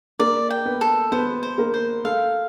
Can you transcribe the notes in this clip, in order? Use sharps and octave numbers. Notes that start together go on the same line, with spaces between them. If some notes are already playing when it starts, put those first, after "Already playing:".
A#3 A#4 D5
G5
B3 B4
A4
B3 B4 C5
C5
A#3 A#4
C5
A3 A4 F5